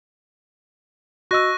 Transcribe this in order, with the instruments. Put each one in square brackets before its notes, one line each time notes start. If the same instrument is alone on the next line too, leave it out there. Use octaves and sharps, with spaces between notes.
[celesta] F#4 D#5 E6 [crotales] C#6 F#6 A#6